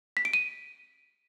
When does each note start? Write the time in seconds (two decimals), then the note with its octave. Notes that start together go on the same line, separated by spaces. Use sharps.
0.17 B6
0.25 D7
0.33 D#7